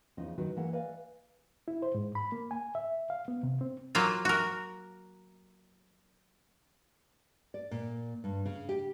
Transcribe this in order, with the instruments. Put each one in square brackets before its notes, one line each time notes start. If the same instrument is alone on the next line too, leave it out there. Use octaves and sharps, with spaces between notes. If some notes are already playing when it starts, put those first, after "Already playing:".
[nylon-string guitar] E2 C#3 F3 D#4 D#5
D#3 F#3 F#4 B4
E3 A#3 A#4 F#5
B4 D5 D#5 F5 G#5
[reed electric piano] E4
C5
G#2
B5
A#3
G#5
E5
F5
B3
C3
C4
[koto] F#3 A#3 F4
F#4 A#4
[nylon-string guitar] D5
A#2
G2
C#3
G4